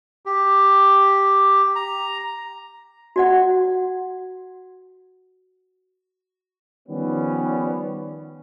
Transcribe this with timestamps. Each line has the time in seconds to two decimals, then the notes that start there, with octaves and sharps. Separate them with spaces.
0.26 G4
1.75 A#5
3.16 F#4 D5 F#5
6.88 D#3 F3 G3 B3 C#4